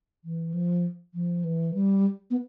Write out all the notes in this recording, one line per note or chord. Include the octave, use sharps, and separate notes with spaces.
E3
F3
F3
E3
G3
B3